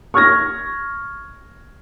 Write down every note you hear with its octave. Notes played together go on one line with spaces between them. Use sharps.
C#6 F6 G#6 A#6